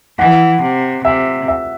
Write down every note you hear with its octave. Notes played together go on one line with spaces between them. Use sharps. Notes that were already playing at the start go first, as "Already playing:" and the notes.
E3 F#5
C3
C3 E5
E5